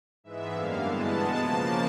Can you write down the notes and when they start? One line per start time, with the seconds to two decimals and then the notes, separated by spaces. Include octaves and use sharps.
0.24 G#2 E3 G#3 B3 E5
0.53 F#2 D3 G3 A#3 F5
0.81 G2 E3 G#3 B3 A5
1.11 B2 G#3 B3 A5
1.40 C#3 F3 A#3 A5